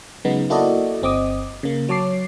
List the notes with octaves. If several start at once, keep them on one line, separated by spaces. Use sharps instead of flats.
C#3 F#3 G#3 B3 D#4
A#3 E4 F#4 A4 D5 D#5
G1 C4 D#5 D6 D#6
C#3 A#3
F#3 C#5 A5 D6 C7